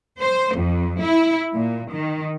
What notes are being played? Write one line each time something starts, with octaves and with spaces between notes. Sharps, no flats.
C5
F2
E4
A#2
D#3